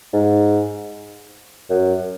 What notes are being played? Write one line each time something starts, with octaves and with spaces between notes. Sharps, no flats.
G#2
F#2